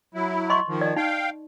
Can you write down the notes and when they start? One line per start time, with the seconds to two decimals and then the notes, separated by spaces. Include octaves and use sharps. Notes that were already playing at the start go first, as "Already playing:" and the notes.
0.15 F#3 E4
0.50 D#5 C6 C#6
0.68 D#3 F3
0.81 D5 D#5
0.96 D#4 F5 G5